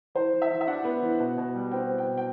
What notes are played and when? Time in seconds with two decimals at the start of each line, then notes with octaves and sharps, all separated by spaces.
0.15 E3 C5
0.33 E3
0.42 E5
0.50 E3
0.61 E5
0.67 D4 F#5
0.85 B3
1.02 E3
1.20 B2
1.38 B2
1.55 G3
1.72 C4 G5
1.90 C4
1.98 G5
2.07 B2
2.18 G5